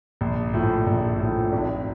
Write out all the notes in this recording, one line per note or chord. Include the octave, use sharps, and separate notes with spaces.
A#1
A2 F3
A#1
A2 F3
G#1